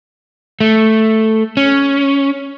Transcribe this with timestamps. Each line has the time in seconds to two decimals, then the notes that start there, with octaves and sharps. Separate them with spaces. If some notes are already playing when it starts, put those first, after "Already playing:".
0.61 A3
1.57 C#4